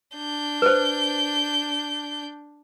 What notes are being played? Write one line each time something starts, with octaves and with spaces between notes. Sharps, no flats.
D4 G6
B4 C5